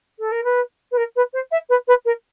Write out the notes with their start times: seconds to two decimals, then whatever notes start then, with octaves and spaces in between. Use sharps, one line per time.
0.19 A4
0.31 A#4
0.43 B4
0.91 B4
0.97 A#4
1.15 B4
1.33 C5
1.51 E5
1.69 B4
1.87 B4
2.05 A#4